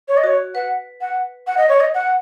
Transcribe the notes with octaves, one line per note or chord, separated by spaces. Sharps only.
C#5
D#5
F#4 C#5
B4 F#5
F#5
F#5
D#5
C#5
D#5
F#5